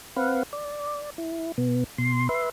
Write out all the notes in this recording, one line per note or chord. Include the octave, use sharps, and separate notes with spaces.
C4 B4 F5 F#5
D5
E4
B2 B3
B2 C6
B4 E5 C6